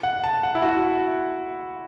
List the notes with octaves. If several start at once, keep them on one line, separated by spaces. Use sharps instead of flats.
F#5
A5
F#5
E4
F#4